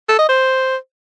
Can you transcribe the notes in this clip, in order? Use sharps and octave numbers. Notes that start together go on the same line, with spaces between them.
A4
D#5
C5